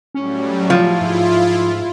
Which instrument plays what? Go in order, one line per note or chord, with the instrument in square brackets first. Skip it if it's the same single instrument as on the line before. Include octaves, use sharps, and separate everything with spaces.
[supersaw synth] A2 F#3 G3 [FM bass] C#4
[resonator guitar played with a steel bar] F3 [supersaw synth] E4 F4
[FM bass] G#2